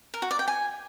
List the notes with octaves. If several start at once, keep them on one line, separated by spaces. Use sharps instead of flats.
A#4
F#4
D5
G5
G#5